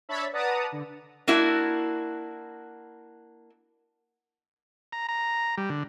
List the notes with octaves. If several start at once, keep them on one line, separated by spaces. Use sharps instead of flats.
D4 C#5 E5 A5 B5
B4 D5 F#5 A5 A#5 D#6
D3
A#3 D4 E4 F#4
A#5
A#5
G3
D3